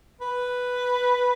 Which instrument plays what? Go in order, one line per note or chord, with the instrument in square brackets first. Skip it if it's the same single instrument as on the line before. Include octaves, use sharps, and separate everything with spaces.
[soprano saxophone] B4